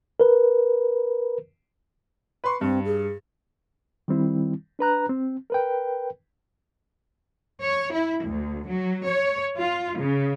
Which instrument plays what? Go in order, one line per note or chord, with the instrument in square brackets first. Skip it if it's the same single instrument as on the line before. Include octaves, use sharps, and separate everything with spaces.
[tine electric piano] A#4 B4
[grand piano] B4 C6 C#6
[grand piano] G2 [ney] C4
[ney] G#4
[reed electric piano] D#3 G3 C4 E4
D4 B4 A#5 F#6
C4
A#4 B4 G5
[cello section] C#5
E4
D2
F#3
C#5
F4
C#3